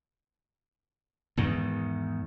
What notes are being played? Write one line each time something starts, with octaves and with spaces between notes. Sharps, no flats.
E2 G#2 D#3